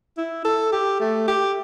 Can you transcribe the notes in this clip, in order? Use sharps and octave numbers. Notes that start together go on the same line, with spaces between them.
E4
A4
G4
A3
G4